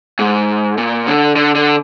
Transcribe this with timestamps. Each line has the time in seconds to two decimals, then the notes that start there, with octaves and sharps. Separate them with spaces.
0.19 G#2
0.78 A#2
1.07 D3
1.36 D3
1.55 D3